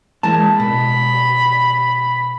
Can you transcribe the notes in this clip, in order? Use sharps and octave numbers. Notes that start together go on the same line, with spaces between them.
E3 G#3 A#3 A5
B2 B5